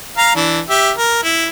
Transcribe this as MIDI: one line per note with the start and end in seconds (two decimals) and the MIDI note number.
0.18 0.35 77
0.18 0.35 82
0.35 0.60 52
0.35 0.60 62
0.70 0.91 67
0.70 0.91 76
0.97 1.21 70
1.23 1.48 64